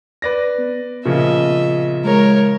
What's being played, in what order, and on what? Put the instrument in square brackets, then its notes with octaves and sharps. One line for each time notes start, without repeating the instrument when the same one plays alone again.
[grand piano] B4 D5 A#6
[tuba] B3
[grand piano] A#2 C#3 F3 [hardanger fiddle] D#5 E5
[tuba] G#3 [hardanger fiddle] A#4 C#5